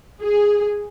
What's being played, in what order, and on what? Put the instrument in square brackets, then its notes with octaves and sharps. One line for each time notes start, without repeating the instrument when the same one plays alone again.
[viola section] G#4